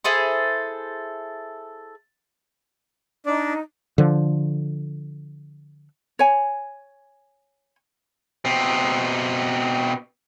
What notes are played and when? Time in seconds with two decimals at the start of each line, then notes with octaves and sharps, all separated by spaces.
0.04 E4 G#4 A4 C5
3.26 D4 D#4 D5
3.98 D3 F3
6.19 C#5 G#5
8.45 B2 C4